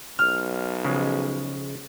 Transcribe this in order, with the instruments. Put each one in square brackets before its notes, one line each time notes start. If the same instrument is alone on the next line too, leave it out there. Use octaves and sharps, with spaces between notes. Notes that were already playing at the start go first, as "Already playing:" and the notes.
[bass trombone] B1 [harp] F6
[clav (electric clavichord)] C#3 F3 G#3